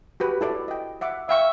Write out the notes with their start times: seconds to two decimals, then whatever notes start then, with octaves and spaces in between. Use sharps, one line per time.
0.20 F#4 G4 B4
0.41 E4 A4 D5
0.68 D#5 G5
1.01 E5 F#5 D6
1.29 E5 F5 G5 C#6